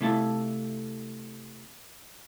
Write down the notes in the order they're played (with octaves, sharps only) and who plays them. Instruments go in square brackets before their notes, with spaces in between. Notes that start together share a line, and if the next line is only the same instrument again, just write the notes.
[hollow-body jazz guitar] C3 A3 E4 A4 F5 A5